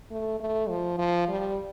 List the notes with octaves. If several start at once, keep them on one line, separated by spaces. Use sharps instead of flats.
A3
A3
F3
F3
G3